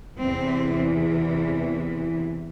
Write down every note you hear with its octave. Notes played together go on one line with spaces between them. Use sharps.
E2 C3 E3 C4